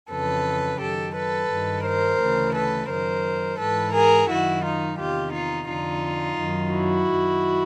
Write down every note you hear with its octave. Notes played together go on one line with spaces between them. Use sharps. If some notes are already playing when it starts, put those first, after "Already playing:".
F2 C#3 E3 A4 B4
F#2 D#3 G4 A4
A4 B4
G2 D#3
A#4 C5
D2 C#3 E3
A4 B4
F#2 D#3 A#4 C5
G#2 E3 A4 B4
G#4 A#4
F#2 D#3 E4 F#4
D#4 F4
E2 C3 D#3 F4 G4
D#4 F4
F2 D3 D#4 F4
F#2 D#3
E4 F#4
F#2 D#3